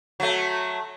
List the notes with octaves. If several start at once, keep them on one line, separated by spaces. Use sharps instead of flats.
F#3 A3